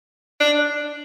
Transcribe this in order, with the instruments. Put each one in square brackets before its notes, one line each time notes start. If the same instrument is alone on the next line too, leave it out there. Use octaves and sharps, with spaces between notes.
[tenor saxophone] D4